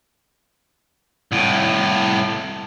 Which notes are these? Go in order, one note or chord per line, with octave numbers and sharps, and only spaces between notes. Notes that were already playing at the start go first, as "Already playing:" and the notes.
C2 A2